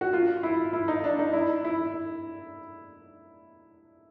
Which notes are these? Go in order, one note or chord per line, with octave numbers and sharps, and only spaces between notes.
F#4
F4
E4
E4
D#4
D4
D#4
E4
E4